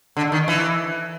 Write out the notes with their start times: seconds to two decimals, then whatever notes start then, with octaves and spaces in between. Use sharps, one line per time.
0.17 D3
0.32 D#3
0.48 E3